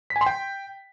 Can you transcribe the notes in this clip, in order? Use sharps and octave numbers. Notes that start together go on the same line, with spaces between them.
B6
G#5
C6
G5